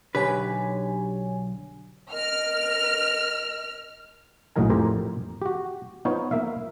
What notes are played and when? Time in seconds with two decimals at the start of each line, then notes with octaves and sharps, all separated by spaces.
0.15 B1 D3 G4 B4 C#5 G#5
2.12 A#4 D#5 F6
4.56 A#1 A2 F#3 D#4 A#4 G#5
4.70 F2 A2 G4 A#4 C5 G#5
5.42 F#4 G4
6.05 B3 D#4 F4 C5 C#5
6.31 A#3 E5 F5